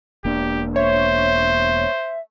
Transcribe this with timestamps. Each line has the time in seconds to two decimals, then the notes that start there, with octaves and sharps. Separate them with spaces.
0.25 E1 A#3 D4 G4
0.76 C5 C#5 E5